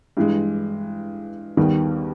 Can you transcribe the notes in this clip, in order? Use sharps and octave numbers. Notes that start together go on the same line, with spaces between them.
G2 E3 G#3
D#2 D#3 G3 B3